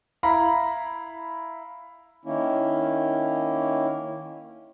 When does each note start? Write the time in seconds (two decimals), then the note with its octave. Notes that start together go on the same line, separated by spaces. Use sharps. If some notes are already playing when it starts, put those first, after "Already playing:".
0.23 E4 F5 A#5 B5
2.25 D#3 A#3 C#4 E4